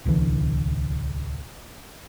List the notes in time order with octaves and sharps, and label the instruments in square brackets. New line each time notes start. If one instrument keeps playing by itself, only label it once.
[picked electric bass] D1 C2 D3 E3